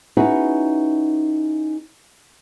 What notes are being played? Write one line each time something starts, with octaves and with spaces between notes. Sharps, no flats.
C#4 D#4 E4 F#4 G#4 B4